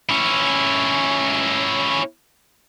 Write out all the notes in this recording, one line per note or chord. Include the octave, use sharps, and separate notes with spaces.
C#4 E4